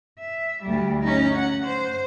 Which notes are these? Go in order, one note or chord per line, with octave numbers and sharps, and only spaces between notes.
E5
D2 G3
C#4 D#4
F#5
C5